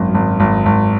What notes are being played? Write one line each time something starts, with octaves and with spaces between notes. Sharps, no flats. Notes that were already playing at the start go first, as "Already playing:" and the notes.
Already playing: G#1 F#2
G#1
G#1
G#1